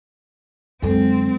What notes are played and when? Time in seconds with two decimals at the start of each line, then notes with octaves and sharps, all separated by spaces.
0.82 F#2 D3 F#3 G#3 C4 A4